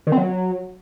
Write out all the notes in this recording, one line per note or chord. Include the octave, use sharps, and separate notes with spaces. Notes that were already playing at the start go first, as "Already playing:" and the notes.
D#3
C4
F#3